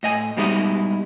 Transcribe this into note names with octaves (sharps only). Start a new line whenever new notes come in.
A2 D#5 G#5
G#2 B2 G3 G#3 D#4 E4